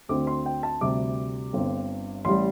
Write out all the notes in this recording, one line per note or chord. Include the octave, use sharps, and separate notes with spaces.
D2 D3 C4 D6
C6
G5
A5
D2 C3 G3 D6
G1 G2 D3 C4
A1 G3 C6